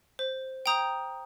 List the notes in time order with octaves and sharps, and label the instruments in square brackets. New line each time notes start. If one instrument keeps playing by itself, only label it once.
[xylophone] C5
G5 A#5 D#6 G6